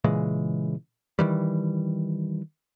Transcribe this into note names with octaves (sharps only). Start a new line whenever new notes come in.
A#2 C#3 E3 G#3
D#3 E3 G3